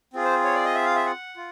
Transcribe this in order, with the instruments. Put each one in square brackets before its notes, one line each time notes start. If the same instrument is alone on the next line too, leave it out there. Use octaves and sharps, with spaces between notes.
[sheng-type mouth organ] C4 F4 G#4
C5
C#5
D5
D#5
E5
F5
E5
F#5
F4